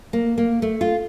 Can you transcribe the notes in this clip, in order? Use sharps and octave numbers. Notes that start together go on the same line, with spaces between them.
A#3
A#3
A3
F4